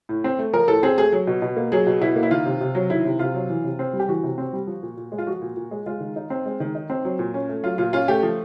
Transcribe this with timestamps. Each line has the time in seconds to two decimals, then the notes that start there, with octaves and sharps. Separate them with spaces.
0.09 A2
0.24 C4
0.39 A3
0.53 F3 A#4
0.68 A2 A4
0.83 C4 G#4
0.98 A3 G#4
1.12 F#3
1.27 B2
1.42 B2
1.56 A#3
1.72 F#3 G#4
1.87 B2
2.01 B2 E4
2.16 A#3
2.23 E4
2.31 D#3 F4
2.45 C3
2.61 C3
2.75 F#3
2.90 D#3 E4
3.05 C3
3.19 C3 F4
3.34 F#3
3.49 E3
3.64 C3
3.79 C4
3.93 G3
4.00 G4
4.09 E3 F#4
4.23 C3
4.38 C4
4.53 G3
4.67 F3
4.83 A#2
4.97 A#2
5.12 G#3
5.18 F4
5.27 F3 F#4
5.42 A#2
5.57 A#2
5.71 G#3
5.86 G#3 F4
6.00 D#3
6.16 D#4
6.30 C4
6.46 G#3
6.60 D#3
6.75 D#4
6.90 C4
7.05 F#3
7.19 A#2
7.34 C#4
7.49 A3
7.63 F#3 F4
7.78 A#2 F4
7.93 C#4 F4
8.08 A3 G4
8.23 F3